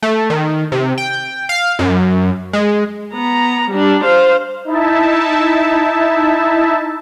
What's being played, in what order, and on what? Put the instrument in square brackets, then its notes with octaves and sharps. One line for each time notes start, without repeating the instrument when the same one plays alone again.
[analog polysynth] A3
D#3
C3
G5
F5
F#2
G#3
[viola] B3 A#5
G3 D4
C5 F5
[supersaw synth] D#4 E4 E5 A5